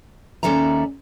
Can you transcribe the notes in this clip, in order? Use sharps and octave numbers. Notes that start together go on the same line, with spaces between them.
D#2 C#4 A4 D5 E5 A#5